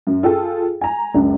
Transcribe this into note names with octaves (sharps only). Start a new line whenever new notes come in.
F#2
F4 G#4 A4 G5
G#5 A#5
C#2 F#2 D4